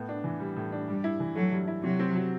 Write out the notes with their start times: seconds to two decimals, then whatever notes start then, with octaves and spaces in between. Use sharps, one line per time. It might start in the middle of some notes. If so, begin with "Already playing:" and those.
Already playing: A2 B3
0.09 D4
0.24 E3
0.40 G3
0.56 A2
0.72 D4
0.88 G2 G3
1.04 E4
1.20 E3
1.35 F#3 A3
1.52 G2
1.68 E4
1.84 C3 F#3
1.99 C4
2.15 F#3